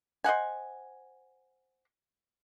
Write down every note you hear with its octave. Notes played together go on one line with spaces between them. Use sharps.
C5 D#5 F#5 G#5